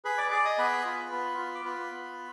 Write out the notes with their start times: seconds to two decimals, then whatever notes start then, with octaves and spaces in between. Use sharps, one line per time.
0.05 G#4 B4 B5
0.18 D5 D6
0.31 G#4 D5 D6
0.45 D#5 D#6
0.58 B3 B4 B5
0.85 F4
1.12 B3
1.38 F4
1.55 D6
1.65 F4 B4 B5
1.91 B3